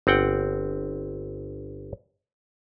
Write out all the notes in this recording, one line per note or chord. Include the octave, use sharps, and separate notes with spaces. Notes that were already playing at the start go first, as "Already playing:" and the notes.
G1 C4 F#5 G5